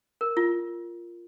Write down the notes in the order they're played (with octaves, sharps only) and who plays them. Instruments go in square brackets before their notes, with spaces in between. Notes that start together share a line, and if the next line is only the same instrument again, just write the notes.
[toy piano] A#4
F4